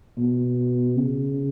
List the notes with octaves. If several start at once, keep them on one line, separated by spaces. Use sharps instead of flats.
B2
C#3